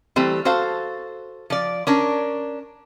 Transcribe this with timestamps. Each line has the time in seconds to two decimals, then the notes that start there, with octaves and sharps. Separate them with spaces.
0.16 E3 G3 A3 C4
0.45 F#4 A4 C5 F5
1.50 F3 D5
1.87 C#4 D4 A#4